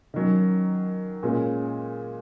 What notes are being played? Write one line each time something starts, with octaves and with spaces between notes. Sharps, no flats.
D#3 F#3 C#4
A#2 G#3 C#4